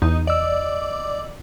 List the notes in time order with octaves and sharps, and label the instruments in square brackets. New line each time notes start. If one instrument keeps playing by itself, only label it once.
[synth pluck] E2 [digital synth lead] D#4
[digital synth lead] D5 [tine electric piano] D#5 E6